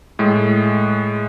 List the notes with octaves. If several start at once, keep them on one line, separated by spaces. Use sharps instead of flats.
A2 G#3